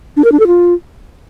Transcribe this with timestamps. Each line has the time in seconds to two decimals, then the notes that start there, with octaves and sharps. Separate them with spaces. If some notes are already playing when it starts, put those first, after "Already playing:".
0.17 D4
0.24 A#4
0.32 D4
0.40 A4
0.47 F4